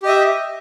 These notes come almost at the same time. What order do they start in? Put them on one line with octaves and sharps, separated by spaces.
G4 D#5 E5